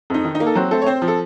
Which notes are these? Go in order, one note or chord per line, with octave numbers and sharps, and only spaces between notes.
F2 D#4
D#3
D#4
A#3
A4
F#3 C4 F#4
A3 C4 A4
C#5
C4 C5
F3
A4